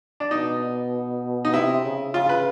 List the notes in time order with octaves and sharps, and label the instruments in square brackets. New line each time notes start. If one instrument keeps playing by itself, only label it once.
[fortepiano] D4
[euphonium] B2 [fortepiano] D#4
[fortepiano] D#4
[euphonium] C3 [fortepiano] E4
[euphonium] C#3
[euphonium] C#3 [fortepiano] F4
[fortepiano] B4